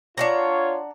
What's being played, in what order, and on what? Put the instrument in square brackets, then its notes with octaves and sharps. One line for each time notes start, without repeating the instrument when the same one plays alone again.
[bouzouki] D4 F#5 A#5 [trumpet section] F4 C#5